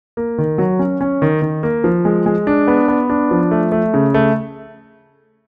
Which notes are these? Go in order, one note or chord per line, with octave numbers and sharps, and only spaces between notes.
A#3
D#3
F#3
C#4
C#4
D#3
D#3
A#3
F3
G#3
G#3
D4
B3
B3
D4
F3
A3
A3
C#3
A3